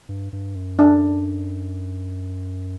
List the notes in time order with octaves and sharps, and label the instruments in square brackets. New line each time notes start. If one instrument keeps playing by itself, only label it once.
[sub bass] G2
G2
F#2
[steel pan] D4